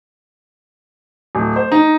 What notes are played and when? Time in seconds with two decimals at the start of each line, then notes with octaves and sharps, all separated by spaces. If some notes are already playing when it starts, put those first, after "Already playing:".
1.35 D1
1.56 C5
1.72 D#4